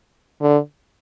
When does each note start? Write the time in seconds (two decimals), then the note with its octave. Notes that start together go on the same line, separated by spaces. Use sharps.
0.41 D3